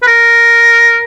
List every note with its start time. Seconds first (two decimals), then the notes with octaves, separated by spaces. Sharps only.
0.03 B4
0.07 A#4